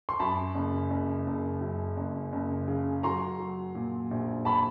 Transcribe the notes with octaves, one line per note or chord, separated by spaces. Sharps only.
C6
F#2 A5 B5
F#1
F#1
F#1
F#2
F#1
F#1
C#3
F#3 A#5 C6
F#3
A#2
A#1
A5 B5